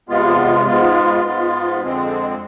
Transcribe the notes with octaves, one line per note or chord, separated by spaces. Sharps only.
E2 C3 G#3 B3 F4
G#2 G#3 B3 F4
G#2 G#3 B3 F4
F2 D3 G#3 C4